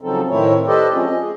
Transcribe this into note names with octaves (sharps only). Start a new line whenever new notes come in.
C#3 F3 F#3 C4 D#4 A4
A2 D#3 A3 C4 E4 C#5
G4 A4 B4 C5 D5 D#5
F3 G#3 A3 C4 C#4 F4
D#5
G#3 G#4